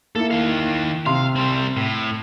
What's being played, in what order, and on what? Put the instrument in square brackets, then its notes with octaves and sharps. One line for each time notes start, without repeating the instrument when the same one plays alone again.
[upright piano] A#3 E4 [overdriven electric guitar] A4
[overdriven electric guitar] D#3 F5
[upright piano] C3 C6 [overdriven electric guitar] F5
[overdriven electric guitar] G3 C4
A2